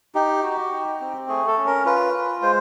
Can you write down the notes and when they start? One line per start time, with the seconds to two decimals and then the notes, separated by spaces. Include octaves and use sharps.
0.15 D#4 G4
0.43 F#4
0.72 D#4
1.00 C4
1.28 A3 G#4
1.47 A4
1.58 C#4
1.66 A#4
1.86 F4 B4
2.13 F4
2.42 G#3 C5